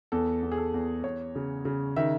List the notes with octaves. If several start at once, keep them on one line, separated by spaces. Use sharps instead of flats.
E2 A4
E2
G#4
A4
E2
E2 C#5
C#3
C#3
D#3 E5